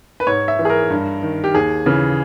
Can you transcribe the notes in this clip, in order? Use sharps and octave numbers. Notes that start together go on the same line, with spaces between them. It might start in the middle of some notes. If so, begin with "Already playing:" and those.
B4
G#2 C#5
E5
E3
G#4
A#4
G2
D#3
G4
D#2 G#4
C#3 E3